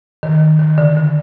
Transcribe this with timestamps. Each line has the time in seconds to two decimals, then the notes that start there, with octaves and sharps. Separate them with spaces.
0.23 D#3
0.59 D#3
0.78 D3
0.97 D3